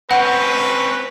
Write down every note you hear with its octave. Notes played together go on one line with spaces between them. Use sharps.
C4 C#4 B4 F#5